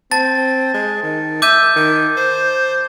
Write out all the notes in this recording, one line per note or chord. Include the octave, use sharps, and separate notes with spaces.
C4 A5 A6
G#3
D#3
E5 D6 G6 D#7
D#3
C5